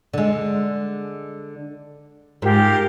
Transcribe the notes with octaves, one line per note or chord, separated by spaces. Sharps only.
D3 G#3
G#2 F4 G4 A#4